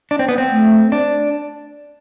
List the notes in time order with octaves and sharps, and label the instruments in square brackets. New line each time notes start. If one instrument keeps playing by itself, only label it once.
[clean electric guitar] D4
C4
B3
C4
[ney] A3
[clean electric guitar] D4